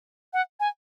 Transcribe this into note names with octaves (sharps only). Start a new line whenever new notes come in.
F#5
G#5